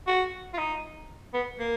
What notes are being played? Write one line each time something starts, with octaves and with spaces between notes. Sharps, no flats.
F#4
F4
D#4
B3
A#3